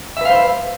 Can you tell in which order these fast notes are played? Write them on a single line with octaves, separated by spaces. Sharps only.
E5 B4 F5 C5